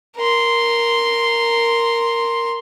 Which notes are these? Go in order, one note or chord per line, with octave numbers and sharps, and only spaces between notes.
A#4 C6